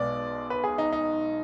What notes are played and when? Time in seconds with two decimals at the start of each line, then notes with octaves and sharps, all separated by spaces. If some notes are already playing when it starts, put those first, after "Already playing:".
Already playing: B1 B2 G#3 B3 D5
0.50 B4
0.64 G#4
0.78 D#4
0.92 D#4